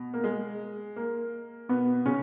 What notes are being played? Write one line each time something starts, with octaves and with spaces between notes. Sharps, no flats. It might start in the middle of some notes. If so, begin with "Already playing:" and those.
Already playing: B2
A#3
G#3
A#3
B2 B3
C#3 C#4